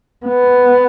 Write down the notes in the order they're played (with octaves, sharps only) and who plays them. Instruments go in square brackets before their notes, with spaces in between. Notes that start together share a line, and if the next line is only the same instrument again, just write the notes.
[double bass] B3